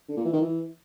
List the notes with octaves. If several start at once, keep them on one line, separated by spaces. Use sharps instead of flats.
D3
A#2
E3
D#3
E3